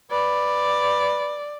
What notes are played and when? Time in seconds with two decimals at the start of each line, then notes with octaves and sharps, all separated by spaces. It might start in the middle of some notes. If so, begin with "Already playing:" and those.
0.11 B4 D5